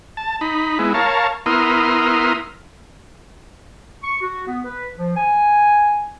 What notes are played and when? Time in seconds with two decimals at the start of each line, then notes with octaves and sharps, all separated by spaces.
0.17 A5
0.41 D#4 B5
0.79 G#3 B3 E4
0.94 A#4 C#5 F5 A5
1.46 B3 E4 A#4 C6 D#6 F6
4.03 C#6
4.21 F#4
4.47 B3
4.65 B4
4.95 F3
5.17 G#5